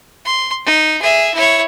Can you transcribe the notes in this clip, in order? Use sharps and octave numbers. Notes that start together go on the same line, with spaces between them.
C6
D#4
G#4 E5
E4 C#5